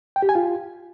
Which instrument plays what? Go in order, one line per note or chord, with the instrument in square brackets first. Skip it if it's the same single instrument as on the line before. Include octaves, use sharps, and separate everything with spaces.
[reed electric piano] G5
G4
G#5
F4